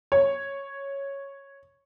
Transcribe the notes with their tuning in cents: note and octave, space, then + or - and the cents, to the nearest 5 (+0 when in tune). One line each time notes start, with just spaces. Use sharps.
C#5 -5